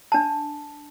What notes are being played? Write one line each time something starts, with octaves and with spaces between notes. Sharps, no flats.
D4 A5